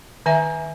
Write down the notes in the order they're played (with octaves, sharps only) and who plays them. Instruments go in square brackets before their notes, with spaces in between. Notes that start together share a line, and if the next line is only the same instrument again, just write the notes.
[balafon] D#3 E5 G#5